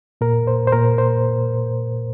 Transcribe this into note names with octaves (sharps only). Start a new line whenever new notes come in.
A#2 A#4
C5
C5
A#2 A#4
C5